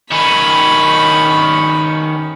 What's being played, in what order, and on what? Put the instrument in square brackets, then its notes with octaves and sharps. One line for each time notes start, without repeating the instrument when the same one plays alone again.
[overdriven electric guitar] D#3 C#4 [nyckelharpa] B5